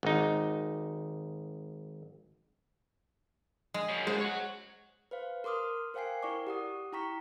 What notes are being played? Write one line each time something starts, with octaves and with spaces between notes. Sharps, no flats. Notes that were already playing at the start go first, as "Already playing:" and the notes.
G#1 D#4
G#3
F#2 C#3
G#3 C5
C#5 F#5
B4 C5 F5
A#4 C6 D6 D#6 F6
A#4 C5 F5 G5 G#5 C7
E4 A#4 D5 C#6 D6
G4 F#5 D#6
E4 G5 A#5 C#6 B6